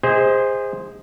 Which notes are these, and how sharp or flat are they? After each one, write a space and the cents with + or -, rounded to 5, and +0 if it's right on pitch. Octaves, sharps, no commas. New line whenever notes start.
G#4 -25 C5 +0 D#5 +25